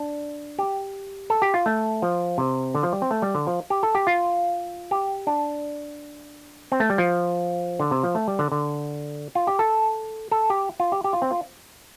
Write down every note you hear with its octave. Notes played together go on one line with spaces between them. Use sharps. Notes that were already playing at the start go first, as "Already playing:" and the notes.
Already playing: D4
G4
A4
G4
F4
A3
F3
C3
D3
F3
G3
C4
A3
G3
D3
F3
G4
A4
G4
F4
G4
D4
C4
A3
G3
F3
D3
C3
F3
A3
G3
D3
D3
F4
G4
A4
A4
G4
F4
G4
G4
F4
C4
F4